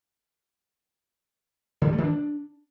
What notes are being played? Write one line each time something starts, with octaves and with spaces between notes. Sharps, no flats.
D3
G3
A3
D#3
D4